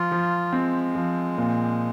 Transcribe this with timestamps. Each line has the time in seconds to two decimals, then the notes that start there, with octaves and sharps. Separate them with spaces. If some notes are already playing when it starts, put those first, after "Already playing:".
Already playing: F3 F4
0.12 F3
0.53 G#3 C4
0.95 F3
1.38 A#2